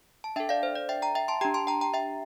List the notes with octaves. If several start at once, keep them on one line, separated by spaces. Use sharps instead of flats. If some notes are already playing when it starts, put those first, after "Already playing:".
A5
D4 A4 E5 G5
D5 F5
C5
D5
E5 G5
G5 A#5
E5 G5
A5 C6
D4 G4 G5 A#5
A5 C6
G5 A#5
G5 A#5
E5 G5